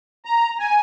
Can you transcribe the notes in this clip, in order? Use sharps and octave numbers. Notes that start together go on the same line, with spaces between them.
A#5
G#5